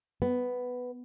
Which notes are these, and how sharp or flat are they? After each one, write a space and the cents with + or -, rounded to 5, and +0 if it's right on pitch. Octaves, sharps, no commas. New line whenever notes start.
B3 +5